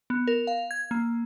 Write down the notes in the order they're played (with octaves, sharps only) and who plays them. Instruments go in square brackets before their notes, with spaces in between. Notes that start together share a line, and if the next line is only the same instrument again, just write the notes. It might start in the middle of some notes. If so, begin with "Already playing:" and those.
[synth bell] B3
A#4
F5
G#6
A#3